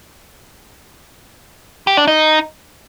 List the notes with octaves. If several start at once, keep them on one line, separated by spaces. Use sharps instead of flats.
G4
D4
D#4